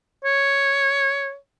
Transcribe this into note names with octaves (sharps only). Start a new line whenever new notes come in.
C#5